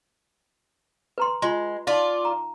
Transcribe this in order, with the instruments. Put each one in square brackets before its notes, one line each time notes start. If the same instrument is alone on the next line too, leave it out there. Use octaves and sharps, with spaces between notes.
[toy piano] B4 A#5 C6
[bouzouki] G#3 [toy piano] F4 C6
[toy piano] D#4 F5 [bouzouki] F4 D5
[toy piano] A#5